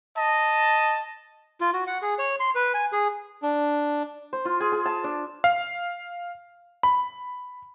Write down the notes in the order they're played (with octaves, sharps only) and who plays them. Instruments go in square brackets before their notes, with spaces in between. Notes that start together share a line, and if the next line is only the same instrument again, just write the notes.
[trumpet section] D#5 A5
[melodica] F4
F#4
F#5
G#4
C#5
C6
B4
G#5
G#4
[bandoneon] D4
[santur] C5
F4
G#4
G#4
A5
D4
[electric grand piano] F5
B5